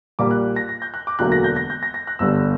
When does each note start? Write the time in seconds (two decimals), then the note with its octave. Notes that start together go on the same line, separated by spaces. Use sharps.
0.19 A#1 A#2 G3 A#3 D6
0.31 F#6
0.56 A#6
0.69 A#6
0.82 G6
0.94 F#6
1.07 D6
1.19 E1 D2 D3 F#3 A#3 F#6
1.32 A#6
1.44 G6
1.56 A#6
1.70 G6
1.83 A#6
1.94 A#6
2.07 F#6
2.19 G1 G2 D3 E6